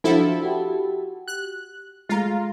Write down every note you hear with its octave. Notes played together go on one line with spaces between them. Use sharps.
F3 D4 E4 F#4 A4
F#4 G4
F#6
G#3 A3 F4 A#5